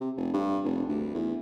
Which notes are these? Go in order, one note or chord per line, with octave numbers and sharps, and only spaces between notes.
C3
F1
G2
F1
D2
E2